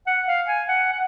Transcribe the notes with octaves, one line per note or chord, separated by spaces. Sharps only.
F#5
F5
G#5
F#5
F#5